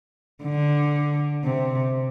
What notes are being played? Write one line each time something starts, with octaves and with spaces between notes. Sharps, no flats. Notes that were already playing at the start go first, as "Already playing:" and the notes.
D3
C3